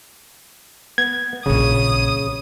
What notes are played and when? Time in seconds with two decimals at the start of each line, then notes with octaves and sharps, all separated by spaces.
0.98 B3 G#6
1.46 A#1 C#3 E3 D#6